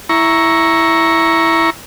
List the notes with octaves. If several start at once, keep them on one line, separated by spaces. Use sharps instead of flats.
E4 A#5 C#6